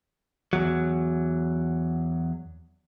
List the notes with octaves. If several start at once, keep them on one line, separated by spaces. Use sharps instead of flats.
E2 F#3